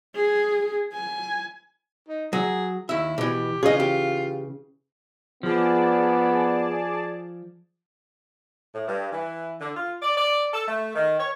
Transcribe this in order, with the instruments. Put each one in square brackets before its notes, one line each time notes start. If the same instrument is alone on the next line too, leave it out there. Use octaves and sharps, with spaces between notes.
[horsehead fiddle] G#4
G#5
[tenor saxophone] D#4
[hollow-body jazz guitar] F#3 [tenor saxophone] G#4
[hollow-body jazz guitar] D#2 E5 [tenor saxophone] E4
[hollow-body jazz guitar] B2 E3 [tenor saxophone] G4
[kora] C#3 E3 [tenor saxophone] F4 [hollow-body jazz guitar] G#4 D#5
[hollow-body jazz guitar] G4
[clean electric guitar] F3 [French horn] B3 [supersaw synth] G#4 D5 A5
[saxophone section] A2
G2
E3
D3
F4
D5
D5
A4
A3
D#3
C#5